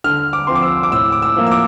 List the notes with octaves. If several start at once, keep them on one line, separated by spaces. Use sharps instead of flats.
D3 F6
D6
F3 C4 C6
D6
E6
D6
A2 E6
D6
E6
F3 A#3
E6
D6